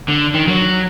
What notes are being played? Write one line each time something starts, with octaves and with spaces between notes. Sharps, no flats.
D3
D#3
F#3